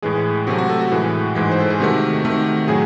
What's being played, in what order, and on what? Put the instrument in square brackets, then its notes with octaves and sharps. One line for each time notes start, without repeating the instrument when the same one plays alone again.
[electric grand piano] A2 E3 G#3 G#4
C3 F#3 A3 F#4
F#4
A4
F#4
A2 E3 G#3
G#2 E3 G#3
C5
A4
G#4
C3 D#3 A3 F#4
C3 D#3 A3
A2 F#3 G#4